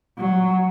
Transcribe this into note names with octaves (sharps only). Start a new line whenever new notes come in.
F#3